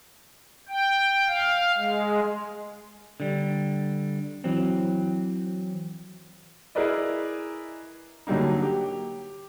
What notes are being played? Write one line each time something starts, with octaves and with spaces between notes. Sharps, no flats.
G5
F5
G#3
D3 G3
E3 F#3 C4
E4 G#4 A#4 B4 D5 D#5
D3 F#3 G3 A#3 D#4
G4